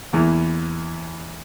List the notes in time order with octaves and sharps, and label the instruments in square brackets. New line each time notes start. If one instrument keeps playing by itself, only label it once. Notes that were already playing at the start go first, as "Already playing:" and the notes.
[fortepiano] E2 E3 A#3